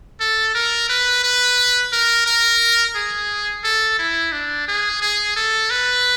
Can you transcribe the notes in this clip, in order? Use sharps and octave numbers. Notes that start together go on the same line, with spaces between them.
A4
A#4
B4
B4
A#4
A#4
G#4
A4
E4
D4
G#4
G#4
A4
B4